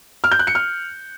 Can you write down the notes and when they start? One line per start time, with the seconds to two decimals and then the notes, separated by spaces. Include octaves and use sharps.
0.24 F6
0.32 G6
0.39 F#6
0.47 C#7
0.55 F6